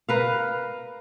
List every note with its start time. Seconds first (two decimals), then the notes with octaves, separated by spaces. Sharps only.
0.09 A#4 B4 F5